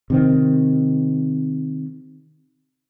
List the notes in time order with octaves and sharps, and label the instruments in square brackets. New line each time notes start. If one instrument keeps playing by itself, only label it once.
[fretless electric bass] C3 D#3 C4